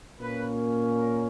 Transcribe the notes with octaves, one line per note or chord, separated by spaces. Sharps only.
A#2 A#3 C#4 B4
A#4